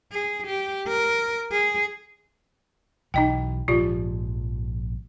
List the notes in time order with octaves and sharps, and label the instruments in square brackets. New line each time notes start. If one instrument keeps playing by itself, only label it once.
[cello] G#4
G4
A#4
G#4
[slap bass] B1 E3 [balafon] D#4 D#5 G5
[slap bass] A#1 G#2 F3 [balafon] F4 G4 D5